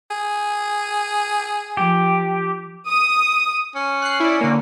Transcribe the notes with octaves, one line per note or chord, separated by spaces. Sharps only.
G#4
F3 G4
D#6
C#4
F#6 C7
E4 D5
D3 A#3